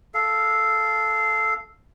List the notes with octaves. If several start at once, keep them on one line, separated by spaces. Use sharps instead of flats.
A4 F5